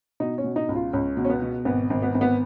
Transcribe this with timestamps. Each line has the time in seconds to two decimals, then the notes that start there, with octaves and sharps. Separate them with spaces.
0.20 B2 D#4
0.38 C#4
0.44 B2
0.56 D#4
0.69 C#2
0.75 F4
0.93 C#2 C#4
1.17 B2
1.25 C#4
1.30 B3
1.42 B2
1.65 G#1 B3
1.90 G#1
2.02 B3
2.15 G#1
2.21 B3